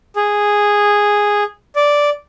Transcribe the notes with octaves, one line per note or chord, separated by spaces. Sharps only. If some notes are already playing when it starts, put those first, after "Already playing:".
G#4
D5